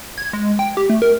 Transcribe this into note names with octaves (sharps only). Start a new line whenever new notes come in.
G#6
G#3
G5
G4
A3
A#4